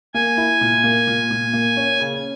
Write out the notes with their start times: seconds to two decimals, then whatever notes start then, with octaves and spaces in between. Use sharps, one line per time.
0.14 A#3 G#5
0.37 E4
0.61 A#2
0.84 A#3
1.07 A#2
1.31 A#2
1.53 A#3
1.77 C#4
2.00 C#3